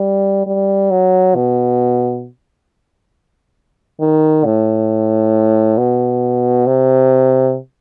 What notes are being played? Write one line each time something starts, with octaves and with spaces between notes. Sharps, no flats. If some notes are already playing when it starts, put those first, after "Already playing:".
Already playing: G3
G3
F#3
B2
D#3
A2
B2
C3